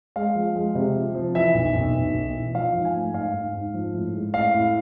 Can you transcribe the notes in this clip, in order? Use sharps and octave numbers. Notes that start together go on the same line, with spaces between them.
G#3 F5
F3
G#3
C3
F3
F3
E3 E5
B1
B1
B1
B1
E3
F3 F5
G#2
G#5
A3
G#2 F5
G#2
G#2
F3
A2
G#3
A2 F5
A2